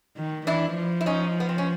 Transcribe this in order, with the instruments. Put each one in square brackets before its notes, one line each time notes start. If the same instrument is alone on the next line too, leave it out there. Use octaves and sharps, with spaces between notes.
[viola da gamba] D#3
[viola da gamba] E3 [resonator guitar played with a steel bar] D4 E4
[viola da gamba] F3
[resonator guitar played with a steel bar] E4
C#4 D#4
B3
C4
C#4